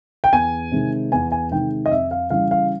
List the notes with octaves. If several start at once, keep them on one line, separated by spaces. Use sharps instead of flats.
G5
E2 G#5
C3 D#3 G#3
E2 G#5
G#5
C3 D#3 G#3 G5
D#5
F2 E5
F5
C#3 E3 G3 F5
F5